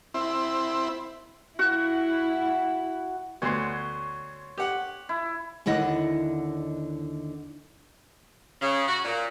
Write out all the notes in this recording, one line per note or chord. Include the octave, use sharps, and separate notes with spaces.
C4 E4
E4 F#4 F#5
D2 B3 C#5 C6
G4 F#5
E4
D#2 D3 E4 D#5 F#5
C#3
F#4
A#2